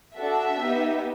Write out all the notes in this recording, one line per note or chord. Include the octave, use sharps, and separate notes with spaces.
D4 F#4 A4 E5
B3 D#4 G4